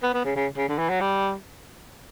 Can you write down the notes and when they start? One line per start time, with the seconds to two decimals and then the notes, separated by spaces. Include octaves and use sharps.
0.03 B3
0.14 B3
0.24 C#3
0.36 C#3
0.57 C#3
0.68 D3
0.78 E3
0.90 F#3
1.01 G3